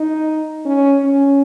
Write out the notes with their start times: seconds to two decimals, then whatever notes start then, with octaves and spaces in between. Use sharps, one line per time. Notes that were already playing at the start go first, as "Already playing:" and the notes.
Already playing: D#4
0.66 C#4
1.05 C#4